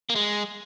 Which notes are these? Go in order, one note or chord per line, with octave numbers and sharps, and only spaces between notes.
A#3
G#3